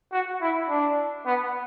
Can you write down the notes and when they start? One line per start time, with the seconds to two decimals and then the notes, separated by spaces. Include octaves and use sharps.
0.12 F#4
0.41 E4
0.69 D4
1.26 B3